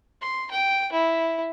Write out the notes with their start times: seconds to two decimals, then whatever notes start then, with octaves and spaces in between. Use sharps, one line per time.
0.22 C6
0.51 G5
0.92 E4